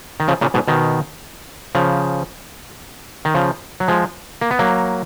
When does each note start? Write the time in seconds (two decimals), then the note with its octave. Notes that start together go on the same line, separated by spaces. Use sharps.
0.20 D#3
0.28 C#3 F3
0.41 A#2 C#3
0.54 G#2 B2
0.68 B2 D#3
1.75 C#3 F3
3.25 D#3
3.35 C#3 F3
3.80 F#3
3.88 F3 G#3
4.41 A#3
4.51 B3
4.59 F#3 A#3